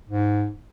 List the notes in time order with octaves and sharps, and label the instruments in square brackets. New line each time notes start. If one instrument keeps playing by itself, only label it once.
[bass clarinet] G#2